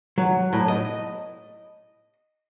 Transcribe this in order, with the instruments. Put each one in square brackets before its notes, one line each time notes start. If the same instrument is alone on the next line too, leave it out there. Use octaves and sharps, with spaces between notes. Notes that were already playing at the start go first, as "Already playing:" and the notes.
[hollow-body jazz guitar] F#3
A2
D#5